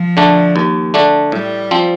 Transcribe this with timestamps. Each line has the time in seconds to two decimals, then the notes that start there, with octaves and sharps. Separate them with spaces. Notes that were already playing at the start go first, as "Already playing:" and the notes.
Already playing: F3
0.17 D3 A3 D4
0.56 D#2
0.94 D3 A3 D4
1.32 A2 G3
1.71 F3 C4